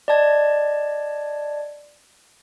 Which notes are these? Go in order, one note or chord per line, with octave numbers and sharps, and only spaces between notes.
D5 D#5 A5 G#6